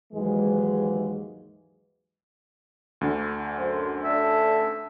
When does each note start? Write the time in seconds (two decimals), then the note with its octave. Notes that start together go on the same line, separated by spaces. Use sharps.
0.13 D#2 G#2 E3 F#3 G#3
3.01 D2 D3
3.56 F#2 F#4 C5
4.04 C#4 D4 A4 E5